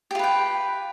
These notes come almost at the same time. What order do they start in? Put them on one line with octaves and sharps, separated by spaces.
G4 F4 B4 G5